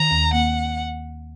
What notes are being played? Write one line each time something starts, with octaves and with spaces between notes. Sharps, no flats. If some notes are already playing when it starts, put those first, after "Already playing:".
Already playing: D#3 A#5
D#2
A#3 F#5